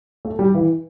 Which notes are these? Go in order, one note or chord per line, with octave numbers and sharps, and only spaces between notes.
A3
G3
E3